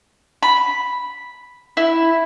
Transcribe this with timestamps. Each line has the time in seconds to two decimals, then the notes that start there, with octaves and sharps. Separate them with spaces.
0.43 B5
1.77 E4